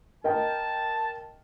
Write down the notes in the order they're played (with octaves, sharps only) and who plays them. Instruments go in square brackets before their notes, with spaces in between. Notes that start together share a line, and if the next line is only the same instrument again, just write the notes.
[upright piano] A#4 D#5 G5 [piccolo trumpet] A5